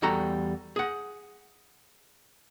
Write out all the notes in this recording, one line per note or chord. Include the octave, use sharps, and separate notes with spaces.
E2 G3 F#4 A4 A#5
G#4 F#5